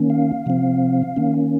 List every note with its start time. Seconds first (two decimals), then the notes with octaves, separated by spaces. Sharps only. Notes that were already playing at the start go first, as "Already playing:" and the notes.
Already playing: D#3 A#3 C#4
0.10 F5
0.46 C3 F3 C4
1.16 D#3 A#3 C#4